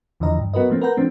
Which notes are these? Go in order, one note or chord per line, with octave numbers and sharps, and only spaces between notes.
E2 D3 E3 F3 D#5 A#5
G2
F#3 B3 F#4 A#4 B4 D#5
F3 A3 A#3 C4
A#4 B4 F#5 A#5 G6
F3 A3 C4 D4